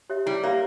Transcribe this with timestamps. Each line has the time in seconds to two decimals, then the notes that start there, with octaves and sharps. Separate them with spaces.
0.10 G4 C#5 E5
0.26 G3 E4
0.43 A#3 G4 C#5 E5